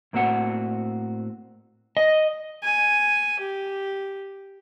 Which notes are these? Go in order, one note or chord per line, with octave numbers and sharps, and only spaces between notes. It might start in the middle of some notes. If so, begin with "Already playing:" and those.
A2 A#3 C4 F#4 G#4 F#5
D#5
G#5
G4